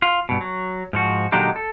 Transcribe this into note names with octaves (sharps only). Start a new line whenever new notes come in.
F4
G2 B2
F#3
G#2 F3 F#4
A#2 D3 F#3 G#3 D#4 G4
A4